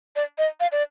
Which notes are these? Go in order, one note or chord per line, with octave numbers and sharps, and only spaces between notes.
D5
D#5
F5
D5